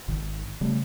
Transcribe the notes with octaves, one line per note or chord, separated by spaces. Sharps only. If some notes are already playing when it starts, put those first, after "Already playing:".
G#1 D#3
C#3 G3 A3